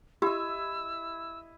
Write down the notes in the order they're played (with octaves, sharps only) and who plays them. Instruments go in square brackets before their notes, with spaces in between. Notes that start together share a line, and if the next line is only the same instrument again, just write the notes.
[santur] E4 D#5 [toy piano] G4 [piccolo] E6